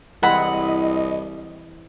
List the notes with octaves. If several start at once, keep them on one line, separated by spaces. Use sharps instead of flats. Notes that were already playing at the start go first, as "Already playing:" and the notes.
C2 E3 G#3 C4 D#5 F#5 B5